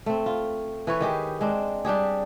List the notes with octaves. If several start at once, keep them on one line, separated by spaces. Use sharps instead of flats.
A3 C4
F4
E3 B4 C#5
D#3 G4 G#4
G#3 C4 D4
G3 D4 G4 G#4